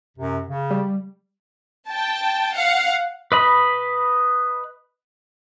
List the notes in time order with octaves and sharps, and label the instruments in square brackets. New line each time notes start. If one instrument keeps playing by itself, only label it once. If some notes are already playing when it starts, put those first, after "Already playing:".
[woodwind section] F#2 C3
C#3
[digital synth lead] G3
[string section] G5 A5
F5 F#5
[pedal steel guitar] B4 D#5 B5